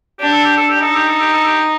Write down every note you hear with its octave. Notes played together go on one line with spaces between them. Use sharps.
D4 G4
A4
G4
A4
G4
D#4 A4
G4
A4
G4
A4
G4